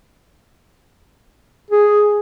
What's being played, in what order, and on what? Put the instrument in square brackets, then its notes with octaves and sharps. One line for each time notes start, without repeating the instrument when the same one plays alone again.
[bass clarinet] G#4